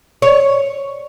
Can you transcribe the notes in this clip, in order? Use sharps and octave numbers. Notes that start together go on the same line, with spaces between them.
C#5